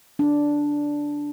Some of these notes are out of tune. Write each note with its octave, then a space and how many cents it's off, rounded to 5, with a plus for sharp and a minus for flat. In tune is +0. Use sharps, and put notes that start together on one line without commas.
D4 -5